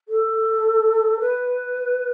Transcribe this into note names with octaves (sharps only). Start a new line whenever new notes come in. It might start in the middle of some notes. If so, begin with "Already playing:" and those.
A4
B4